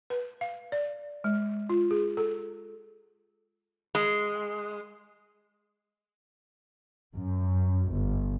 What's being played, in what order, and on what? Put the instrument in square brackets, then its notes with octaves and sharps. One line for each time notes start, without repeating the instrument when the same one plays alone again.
[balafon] B4
F5
D5
G#3
F4
G#4
A4
[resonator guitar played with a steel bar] G#3
[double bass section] F#2
G1